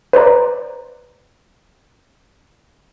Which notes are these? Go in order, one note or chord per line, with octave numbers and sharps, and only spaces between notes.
B4 C5 D5 A#5